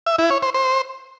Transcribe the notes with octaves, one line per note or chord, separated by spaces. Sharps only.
E5
E4
C#5
C5
C5